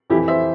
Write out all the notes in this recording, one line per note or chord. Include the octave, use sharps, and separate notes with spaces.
F2 E3 E4 G4
C5 E5